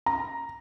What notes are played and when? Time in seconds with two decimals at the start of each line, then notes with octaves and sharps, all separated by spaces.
0.06 A#5